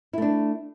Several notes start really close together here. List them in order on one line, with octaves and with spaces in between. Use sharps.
E4 A3 D4